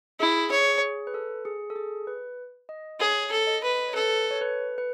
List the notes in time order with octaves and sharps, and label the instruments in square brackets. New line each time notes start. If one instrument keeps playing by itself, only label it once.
[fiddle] E4 [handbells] G#4
[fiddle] C#5
[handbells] G#4
B4
A4
G#4
A4
G#4
B4
D#5
[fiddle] G#4 [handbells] C#5
[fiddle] A4
[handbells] D#5
[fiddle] B4
[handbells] C#5
[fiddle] A4 [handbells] B4
[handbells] C#5
B4
B4